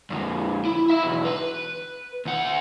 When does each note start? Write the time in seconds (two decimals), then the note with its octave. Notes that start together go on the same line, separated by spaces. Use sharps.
0.10 F2 D3
0.65 E4
0.90 E5 B5
1.03 B1 E2
1.25 B4
2.25 D2 F#5